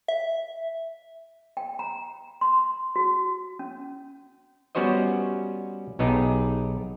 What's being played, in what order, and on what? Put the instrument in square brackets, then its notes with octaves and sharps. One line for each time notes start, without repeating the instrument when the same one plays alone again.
[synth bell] E5
[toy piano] G5
A#5
C6
F#4
C#4
[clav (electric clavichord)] G3 B3 C#4 F#4 C5 D#5
B1 B3 D#4 G4 G#4